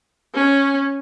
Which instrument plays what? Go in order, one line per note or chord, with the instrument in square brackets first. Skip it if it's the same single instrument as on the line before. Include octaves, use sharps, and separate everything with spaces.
[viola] C#4